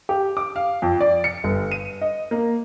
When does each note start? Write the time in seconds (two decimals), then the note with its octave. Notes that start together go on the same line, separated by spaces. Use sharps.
0.09 G4
0.37 D6
0.56 F5
0.82 F2
1.01 D5
1.24 C#7
1.44 G1
1.72 D#7
2.01 D#5
2.31 A#3